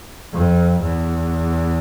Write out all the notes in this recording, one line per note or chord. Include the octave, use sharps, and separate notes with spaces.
F2
E2